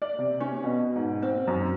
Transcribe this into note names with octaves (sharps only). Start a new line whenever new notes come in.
D5
C3
C#4
B2
G#2
C4
F#2